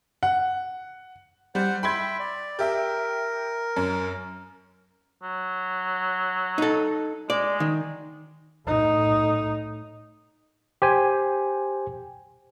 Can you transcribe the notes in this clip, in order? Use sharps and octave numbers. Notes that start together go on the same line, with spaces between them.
F#5
G3 C5 F#5
E5 G5 B5 C6 G#6
D5
G4 A#4 E5 G5
F#2
F#3
D#4 A4
G#3 D5
D#3
A2 D#4
G4 C5 G#5